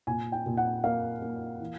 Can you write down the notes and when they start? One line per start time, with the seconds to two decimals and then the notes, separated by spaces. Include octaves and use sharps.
0.07 A#2 G#5
0.32 G5
0.46 A#2
0.57 F#5
0.84 A#3 F5
1.22 A#3
1.60 E3